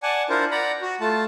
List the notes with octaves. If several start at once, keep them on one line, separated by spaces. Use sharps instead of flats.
D5 F#5 G#5 A5
D4 E4 F4 A#4 C5
D5 F#5 A#5 B5
F#4
A3 F4 A5